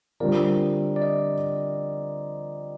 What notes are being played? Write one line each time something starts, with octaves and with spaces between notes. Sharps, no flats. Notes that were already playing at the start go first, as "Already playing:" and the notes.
D3 G3 C4 F4 A#4 D5
D5
D#5